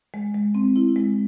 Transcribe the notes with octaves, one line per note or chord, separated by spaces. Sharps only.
G#3
G#3
C4
E4
G#3